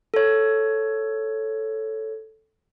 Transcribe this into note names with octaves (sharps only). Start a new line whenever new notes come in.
A4 C#5